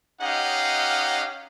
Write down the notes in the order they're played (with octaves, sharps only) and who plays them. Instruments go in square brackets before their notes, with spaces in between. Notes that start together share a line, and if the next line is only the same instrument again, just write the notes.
[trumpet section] C#4 D#4 G4 D#5 F5 F#5